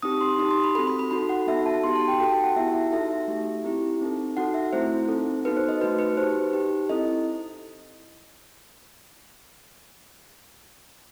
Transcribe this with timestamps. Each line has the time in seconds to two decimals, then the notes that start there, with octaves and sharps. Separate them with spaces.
0.02 C4 D#4 G4 D#6
0.21 C6
0.39 D#4 G4 D#6
0.51 C6
0.64 B5
0.75 C4 F#4 A4 B5
0.87 B5
0.99 B5
1.11 D#4 F#4 A4 B5
1.29 F#5
1.47 B3 D#4 F#4 A4 E5
1.66 A5
1.84 B3 D#4 G4 C6
1.96 A5
2.08 G5
2.20 D#4 F#4 A4 G5
2.32 A5
2.44 F#5
2.56 B3 E4 G4 E5
2.92 D#4 F#4 A4 E5
3.28 A3 D#4 G4
3.64 C4 E4 G4
4.01 C4 D#4 A4
4.37 D#4 F#4 A4 F#5
4.54 E5
4.73 A3 C4 E4 C5
5.08 C4 D#4 A4
5.45 B3 D#4 F#4 A4 B4
5.57 C5
5.69 D#5
5.81 A3 D#4 F#4 B4
5.99 B4
6.17 D#4 G4 C5
6.53 D#4 G4
6.89 C4 E4 A4 D#5